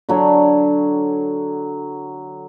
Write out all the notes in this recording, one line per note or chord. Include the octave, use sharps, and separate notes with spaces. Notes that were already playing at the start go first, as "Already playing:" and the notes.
D3 F#3 C#5